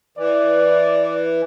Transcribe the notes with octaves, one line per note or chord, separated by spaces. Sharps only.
E3 D5